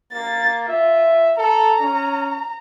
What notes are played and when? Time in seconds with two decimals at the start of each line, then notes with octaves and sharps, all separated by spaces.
0.13 A#3 A6
0.68 F4 E5
1.38 A4 A#5
1.81 C#4